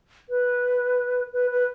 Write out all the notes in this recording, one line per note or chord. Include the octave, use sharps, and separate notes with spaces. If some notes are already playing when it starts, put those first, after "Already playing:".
B4
B4
B4